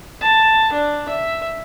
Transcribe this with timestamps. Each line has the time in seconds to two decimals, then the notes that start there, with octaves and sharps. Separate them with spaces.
0.21 A5
0.72 D4
1.09 E5